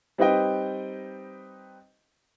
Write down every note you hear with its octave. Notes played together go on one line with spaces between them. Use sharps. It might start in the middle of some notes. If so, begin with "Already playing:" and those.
G3 C4 D#4 B4 D#5 G5